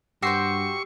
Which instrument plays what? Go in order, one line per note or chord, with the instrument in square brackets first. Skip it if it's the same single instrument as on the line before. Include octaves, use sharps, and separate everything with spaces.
[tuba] G2 [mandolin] F#4 C5 G5 [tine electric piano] G4 E6 C7 [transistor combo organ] C#6